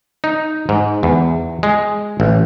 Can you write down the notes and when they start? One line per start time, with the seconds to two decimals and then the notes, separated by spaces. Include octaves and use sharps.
0.24 D#4
0.69 G#2
1.03 E2
1.63 G#3
2.20 A1